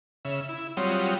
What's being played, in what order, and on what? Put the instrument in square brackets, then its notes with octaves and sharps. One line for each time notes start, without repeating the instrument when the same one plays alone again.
[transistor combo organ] C#3 E5
E4
F#3 G3 C4 F4 C#5 D#6